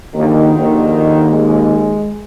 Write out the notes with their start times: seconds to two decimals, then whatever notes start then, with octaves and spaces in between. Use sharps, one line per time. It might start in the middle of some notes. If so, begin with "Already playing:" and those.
0.15 A#1 D#2 D3 D#3
0.56 D#2
1.29 G#3